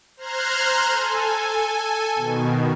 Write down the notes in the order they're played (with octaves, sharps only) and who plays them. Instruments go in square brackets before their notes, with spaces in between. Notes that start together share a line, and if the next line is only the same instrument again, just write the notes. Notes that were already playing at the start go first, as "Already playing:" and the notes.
[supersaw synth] C5 A#5 C6 F6 F#6 G#6
A4 G#5
B2 D#3